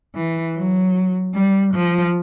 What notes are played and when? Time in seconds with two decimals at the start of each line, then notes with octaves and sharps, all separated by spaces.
0.15 E3
0.56 F#3
1.35 G3
1.74 F3